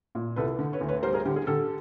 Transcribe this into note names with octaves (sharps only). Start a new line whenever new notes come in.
A#2
C2 A4 B4
D3
B4 C#5
D2
B4 C#5
G3 A#4 C5
G#4 A#4
D3 G4
G#4
D3 G4 A4